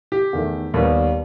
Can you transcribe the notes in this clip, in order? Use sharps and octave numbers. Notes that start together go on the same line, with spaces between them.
G4
E2 D#3 A3
D#2 D#3 G3 B3